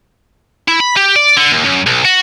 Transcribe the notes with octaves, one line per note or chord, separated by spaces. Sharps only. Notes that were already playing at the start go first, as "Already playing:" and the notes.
E4
B5
G4
D5
D3
D#2
F#2
B1
F#4